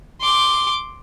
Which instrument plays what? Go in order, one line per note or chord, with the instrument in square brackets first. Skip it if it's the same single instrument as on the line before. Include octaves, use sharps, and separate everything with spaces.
[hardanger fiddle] C6 D6